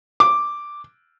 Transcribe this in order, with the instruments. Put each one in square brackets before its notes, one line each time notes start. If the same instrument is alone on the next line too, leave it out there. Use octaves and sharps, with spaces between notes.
[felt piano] D6